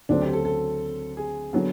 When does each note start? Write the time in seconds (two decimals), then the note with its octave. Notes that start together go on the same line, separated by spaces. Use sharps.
0.09 D2 C#3 F#3 A3 C4 D4
0.22 G4
0.33 A4
0.45 A4
1.17 G#4
1.53 D3 F#3 B3